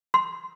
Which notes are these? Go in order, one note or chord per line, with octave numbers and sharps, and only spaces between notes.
C6